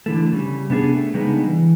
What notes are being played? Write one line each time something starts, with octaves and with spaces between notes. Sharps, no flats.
D3 E3 A3
C#3 G3
C3 B3 D4 G#4
A3
C#3 G3 G#3 B3 D4 D#4
E3